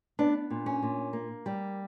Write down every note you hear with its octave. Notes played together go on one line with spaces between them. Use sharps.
B3 D4
A#2
C#4
A#2
A#3
G3